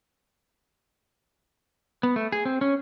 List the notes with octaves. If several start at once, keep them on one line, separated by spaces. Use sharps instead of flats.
B3
A3
G#4
C4
C#4